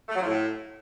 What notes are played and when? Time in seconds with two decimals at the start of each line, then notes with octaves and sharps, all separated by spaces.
0.09 A3
0.14 F#3
0.20 F3
0.26 A2